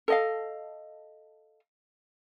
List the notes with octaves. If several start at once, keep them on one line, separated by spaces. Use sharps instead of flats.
A4 D#5 F5